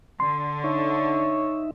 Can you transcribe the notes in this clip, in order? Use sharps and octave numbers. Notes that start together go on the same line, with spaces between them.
D3 C6
D#4 C#5 E5